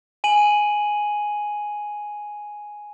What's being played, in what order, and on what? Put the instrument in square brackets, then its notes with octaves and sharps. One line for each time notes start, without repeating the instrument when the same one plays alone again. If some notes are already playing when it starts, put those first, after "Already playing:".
[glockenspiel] G#5 D#7 F#7